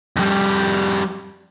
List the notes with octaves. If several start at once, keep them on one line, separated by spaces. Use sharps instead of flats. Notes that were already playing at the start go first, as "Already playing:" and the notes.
F2 G3